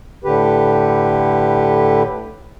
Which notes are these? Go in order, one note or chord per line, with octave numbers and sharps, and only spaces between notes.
A2 D3 G4 B4